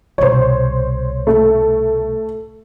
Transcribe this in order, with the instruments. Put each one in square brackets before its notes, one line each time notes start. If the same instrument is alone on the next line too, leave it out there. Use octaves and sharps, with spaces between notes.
[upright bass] C2 B2 [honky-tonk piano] C5 C#5
[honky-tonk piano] A3